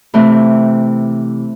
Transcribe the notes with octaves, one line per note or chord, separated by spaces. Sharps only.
C3 E3 A3 C4